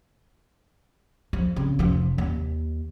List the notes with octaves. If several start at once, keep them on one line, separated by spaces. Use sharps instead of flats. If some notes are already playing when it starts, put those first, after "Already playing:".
F3
C#3 C4
F1 F3
D#2